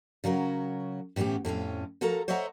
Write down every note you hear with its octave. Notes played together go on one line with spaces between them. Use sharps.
C#3 F#3 F#4 A#4
A2 E3 B3 C#4 G4
F2 A2 C4 C#4
F3 F#4 A4 A#4 A#5
C5 C#5 D#5 E5 F#5 A#5